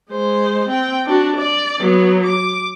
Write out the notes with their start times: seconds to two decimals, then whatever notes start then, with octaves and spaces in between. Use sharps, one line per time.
0.11 G#3 C5
0.68 C4 G5
1.06 D4 F#4
1.37 D5
1.80 F#3 B3
2.25 D6